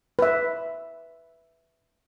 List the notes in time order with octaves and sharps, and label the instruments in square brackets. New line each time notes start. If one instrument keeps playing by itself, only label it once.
[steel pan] B4 E5